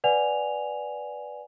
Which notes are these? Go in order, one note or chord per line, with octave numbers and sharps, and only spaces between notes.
B4 D5 F#5 G#5 F7